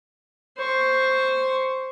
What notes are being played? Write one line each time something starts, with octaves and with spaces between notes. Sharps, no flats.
C5 C#6